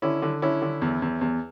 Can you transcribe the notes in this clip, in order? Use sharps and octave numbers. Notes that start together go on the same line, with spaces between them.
D3 C#4 E4
D3
D3 C#4 E4
D3
E2
E2
E2